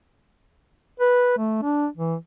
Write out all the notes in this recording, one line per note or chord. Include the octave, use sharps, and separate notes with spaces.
B4
A3
D4
E3